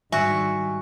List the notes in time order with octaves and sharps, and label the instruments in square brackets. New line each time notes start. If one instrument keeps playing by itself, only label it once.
[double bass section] G#2 D#3 G3 [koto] F#4 [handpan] E5 [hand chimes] G#5